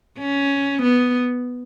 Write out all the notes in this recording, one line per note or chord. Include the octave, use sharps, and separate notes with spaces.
C#4
B3